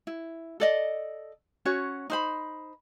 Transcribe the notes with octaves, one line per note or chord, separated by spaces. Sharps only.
E4
A4 D5 D#5
C#4 F#4 C#5
D#4 C5 B5